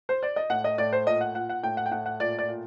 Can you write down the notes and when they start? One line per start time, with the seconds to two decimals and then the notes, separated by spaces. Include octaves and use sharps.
0.09 C5
0.23 D5
0.36 D#5
0.50 A2 F#5
0.64 D#5
0.78 A2 D5
0.93 C5
1.07 A#2 D#5
1.21 F#5
1.35 A#2 F#5
1.49 F#5
1.63 A2 G5
1.77 F#5
1.86 G5
1.92 A2 F#5
2.06 F#5
2.20 A#2 D5
2.39 D5
2.48 A#2